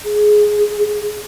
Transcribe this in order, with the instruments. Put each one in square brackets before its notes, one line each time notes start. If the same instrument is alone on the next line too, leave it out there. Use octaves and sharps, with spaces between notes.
[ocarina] G#4